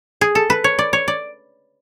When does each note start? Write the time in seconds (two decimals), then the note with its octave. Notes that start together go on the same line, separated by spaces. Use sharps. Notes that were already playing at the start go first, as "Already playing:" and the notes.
0.21 G#4
0.35 A4
0.50 B4
0.64 C#5
0.79 D5
0.93 C#5
1.08 D5